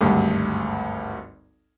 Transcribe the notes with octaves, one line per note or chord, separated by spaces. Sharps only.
G#1 D2 G2